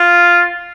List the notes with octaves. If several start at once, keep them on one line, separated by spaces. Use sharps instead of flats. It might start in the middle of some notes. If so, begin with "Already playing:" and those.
Already playing: F4